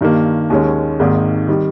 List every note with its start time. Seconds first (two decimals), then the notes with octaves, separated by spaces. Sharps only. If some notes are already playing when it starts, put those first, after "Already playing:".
0.01 G2 D#3 A#3
0.50 D#2 D#3 G#3 C#4
0.99 G#1 G#2 D#3 A#3
1.48 D#3 G3